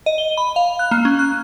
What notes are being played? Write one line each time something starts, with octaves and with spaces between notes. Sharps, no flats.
D#5
G7
B5
F5
F#6
A#3
C#4
F#6